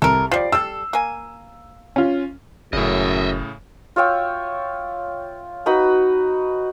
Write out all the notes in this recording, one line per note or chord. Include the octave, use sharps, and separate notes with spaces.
C2 A4 A#4
F3 G3 D5 C7
G3 A4 E6
A#3 G#5
C#4 F4
F#1 F#2 A2 C#3 D#5 E5
F4 C#5 E5 G5
D#4 F#4 B4 B5